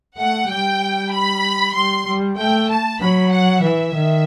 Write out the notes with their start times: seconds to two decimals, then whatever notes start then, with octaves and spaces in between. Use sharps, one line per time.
0.17 A3 F#5
0.49 G3 G5
1.13 B5
1.75 G3 C6
2.07 G3
2.38 A3 G5
2.69 A5
3.01 F#3 B5
3.32 F#5
3.63 E3 E5
3.95 D#3